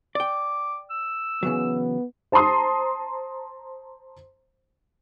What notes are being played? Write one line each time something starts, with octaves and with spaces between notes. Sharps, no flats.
D5 G5 D6
E6
C#3 E3 F#3 B3
C5 A5 A#5 C6 D#6